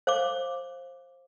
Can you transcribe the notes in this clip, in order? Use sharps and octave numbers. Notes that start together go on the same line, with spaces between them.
C5 F5 D6